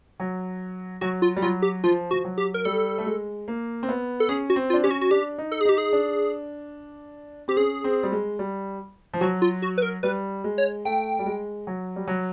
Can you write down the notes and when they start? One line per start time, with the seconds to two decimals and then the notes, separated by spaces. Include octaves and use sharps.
0.20 F#3
1.01 F#3 F#4
1.22 F4
1.37 G3
1.42 F#3 F4
1.62 G4
1.84 F3 F4
2.11 F3 F#4
2.25 F#3
2.38 G4
2.54 A#4
2.65 G3 A4
2.98 A3
3.06 G#3
3.48 A#3
3.83 C4
3.89 B3
4.20 A4
4.29 C#4 G#4
4.50 F#4
4.56 C4
4.70 F4
4.73 D4
4.84 C#4 G4
4.91 F#4
5.01 F#4
5.11 D4 G4
5.38 D#4
5.52 A4
5.61 G#4
5.65 D#4 G4
5.78 G#4
5.93 D4
7.48 C4 G4
7.57 C#4 G#4
7.84 C4
8.03 G3
8.12 G#3
8.39 G3
9.14 F3
9.21 F#3 F#4
9.42 F4
9.62 F#4
9.78 B4
9.82 A#4
10.03 G3 B4
10.44 G#3
10.58 C#5
10.85 A3 G5
11.19 G3
11.26 G#3
11.67 F#3
11.96 G3
12.08 F#3